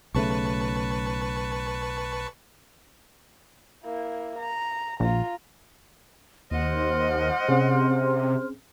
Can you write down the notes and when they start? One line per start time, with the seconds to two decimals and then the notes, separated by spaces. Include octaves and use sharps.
0.15 B1 C#3 A3 B4 A5 C#6
3.84 A#3 E4
4.39 A#5
5.00 A#1 F4 A#5
6.51 D#2 C5 D#5 F#5 C6 F6
7.48 C3 C4 C#4 G#4